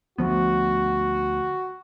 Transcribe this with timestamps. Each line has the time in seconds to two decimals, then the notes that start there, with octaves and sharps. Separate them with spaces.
0.18 D2 F3 B3 F#4